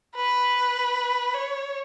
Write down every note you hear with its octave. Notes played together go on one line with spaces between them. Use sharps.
B4
C#5